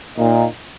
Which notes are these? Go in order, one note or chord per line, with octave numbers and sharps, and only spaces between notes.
A#2 A#3 D#4